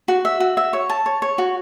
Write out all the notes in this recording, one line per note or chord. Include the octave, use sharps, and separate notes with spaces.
F#4
E5
F#4
E5
C#5
A5
C#5
C#5
F#4